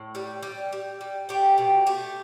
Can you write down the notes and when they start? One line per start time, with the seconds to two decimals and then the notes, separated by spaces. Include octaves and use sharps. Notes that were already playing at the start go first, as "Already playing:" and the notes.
Already playing: A2
0.15 G3
0.43 G3
0.72 G3
1.01 G3
1.29 A3 G4
1.58 B2
1.86 A3 G4